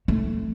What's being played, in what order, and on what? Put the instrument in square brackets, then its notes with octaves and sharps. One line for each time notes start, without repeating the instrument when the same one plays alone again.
[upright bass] A3